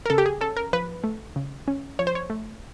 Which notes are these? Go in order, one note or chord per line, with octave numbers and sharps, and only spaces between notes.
A#4
C#3 A4
G4
G#4
C#4 A4
A#4
F3 B4
A3
C#3
C#4
F3 C#5
C5
C#5
A3